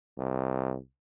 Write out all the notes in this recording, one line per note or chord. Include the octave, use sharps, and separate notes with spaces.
C2